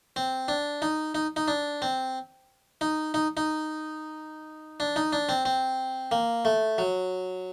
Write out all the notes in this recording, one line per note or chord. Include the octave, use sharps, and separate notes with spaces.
C4
D4
D#4
D#4
D#4
D4
C4
D#4
D#4
D#4
D4
D#4
D4
C4
C4
A#3
A3
F#3